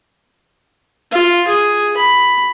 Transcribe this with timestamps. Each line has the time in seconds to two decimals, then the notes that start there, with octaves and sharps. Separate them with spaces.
1.12 F4
1.48 G#4
1.97 B5